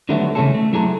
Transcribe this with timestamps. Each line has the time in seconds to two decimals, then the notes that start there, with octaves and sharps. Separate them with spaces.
0.09 D3 D#3 F#3 G3 A3 B3
0.35 C#3 E3 A3 C#4 G#4 A4
0.55 A3
0.73 F#3 E4 G#4 A4 A#5